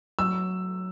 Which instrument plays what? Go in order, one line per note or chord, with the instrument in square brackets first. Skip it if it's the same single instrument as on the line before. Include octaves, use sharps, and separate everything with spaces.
[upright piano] F#3 E6